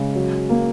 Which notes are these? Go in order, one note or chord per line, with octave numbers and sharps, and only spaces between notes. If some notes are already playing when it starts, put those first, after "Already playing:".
Already playing: C#3 G#3
F#3
A#3